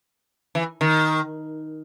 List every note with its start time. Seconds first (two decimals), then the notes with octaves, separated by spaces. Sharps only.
0.55 E3
0.81 D#3